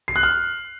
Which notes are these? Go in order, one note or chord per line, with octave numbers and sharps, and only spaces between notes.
C7
F#6
F6